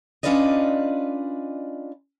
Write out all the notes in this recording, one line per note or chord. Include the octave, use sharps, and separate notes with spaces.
C#4 D4 F4 B4 D5 D#5